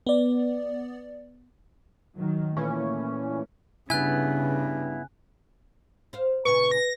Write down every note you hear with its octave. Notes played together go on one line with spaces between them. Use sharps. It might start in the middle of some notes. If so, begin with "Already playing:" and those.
B3 D5
D#3 F#3
A#2 E3 A3 C#4
G2 C#3 B3 E4 G#5 F#6
C5 F5
A#2 C#3 B4 C#6
A#6